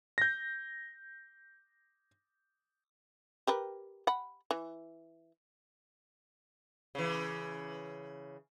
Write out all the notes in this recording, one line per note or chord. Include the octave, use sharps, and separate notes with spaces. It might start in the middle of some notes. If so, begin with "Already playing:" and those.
G6 A#6
G4 A#4 B4
F#5 B5
E3
C#3 E3